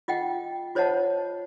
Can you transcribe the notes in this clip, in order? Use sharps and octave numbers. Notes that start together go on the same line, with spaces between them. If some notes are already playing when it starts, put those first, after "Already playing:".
F4 D#5 F#5 G5
F4 C5 C#5 D#5 F#5 A5